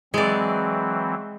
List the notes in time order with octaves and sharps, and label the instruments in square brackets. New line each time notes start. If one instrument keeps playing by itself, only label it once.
[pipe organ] E3 F#3 C4 [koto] G#3 D5